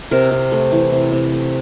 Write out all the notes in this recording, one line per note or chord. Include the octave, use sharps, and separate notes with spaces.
C3 A#4
C3
A3
E3
C3
C3
A3